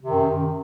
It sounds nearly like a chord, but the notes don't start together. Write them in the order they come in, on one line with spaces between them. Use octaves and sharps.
C3 D#3 F#2